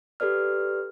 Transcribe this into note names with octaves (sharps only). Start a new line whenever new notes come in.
G4 A4 B4 D5 F6